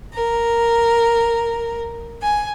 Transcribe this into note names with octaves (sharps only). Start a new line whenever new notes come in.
A#4
G#5